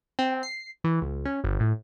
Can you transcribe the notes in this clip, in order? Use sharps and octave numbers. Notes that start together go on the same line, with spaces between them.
C4
C7
E3
C#2
C#4
G1
A2